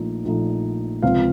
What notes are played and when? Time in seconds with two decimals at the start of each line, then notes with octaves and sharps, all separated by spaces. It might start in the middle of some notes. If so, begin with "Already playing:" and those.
Already playing: A#1 A#2 F3 A3 D#4
0.25 A#1 A#2 F3 A3 D#4
1.03 C#2 C3 F3 C4 F4 F5